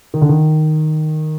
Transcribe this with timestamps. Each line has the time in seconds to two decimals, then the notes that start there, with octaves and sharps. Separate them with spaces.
0.14 D#3
0.22 D3
0.29 D#3